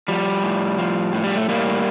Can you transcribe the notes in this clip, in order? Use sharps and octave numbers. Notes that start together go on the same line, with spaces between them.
F3 G3
A2
F3
A2
G3
A3
A2 G3 A#3